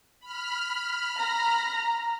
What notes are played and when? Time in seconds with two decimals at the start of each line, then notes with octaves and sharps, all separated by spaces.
0.20 B5 F6
1.19 A#5